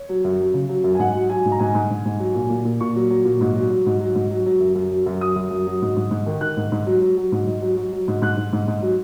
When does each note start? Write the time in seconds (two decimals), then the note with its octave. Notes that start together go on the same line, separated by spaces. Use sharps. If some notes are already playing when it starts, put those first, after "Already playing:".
Already playing: C#5
0.09 F#3
0.24 F#2
0.40 F#3
0.54 C#3
0.69 F#3
0.84 F#2
0.95 G#5
0.99 G#2 F#5
1.15 F#3
1.30 F#3 G#5
1.45 G#2
1.52 A#5
1.59 G#2 G#5
1.74 G#2
1.90 G#2
2.05 G#2
2.19 F#3
2.35 A#2
2.50 A#2
2.65 A#2
2.80 A#2 C#6
2.96 F#3
3.10 F#3
3.25 A#2
3.41 G#2
3.56 F#3
3.70 F#3
3.86 G#2
4.00 F#3
4.15 G#2
4.31 F#3
4.46 F#3
4.60 F#2
4.75 F#2
4.91 F#3
5.06 F#2
5.21 F#3 D#6
5.36 F#2
5.51 F#2
5.67 F#3
5.82 G#2
5.96 G#2
6.11 G#2
6.26 D#3
6.41 D#3 F#6
6.57 G#2
6.72 G#2
6.87 F#3
7.01 F#3
7.17 F#3
7.32 G#2
7.47 G#2
7.62 F#3
7.77 F#3
7.92 F#3
8.08 G#2
8.22 G#2 F#6
8.37 G#2
8.53 G#2
8.68 G#2
8.82 F#3